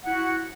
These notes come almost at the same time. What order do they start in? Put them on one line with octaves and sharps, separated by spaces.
F#5 E4 F#4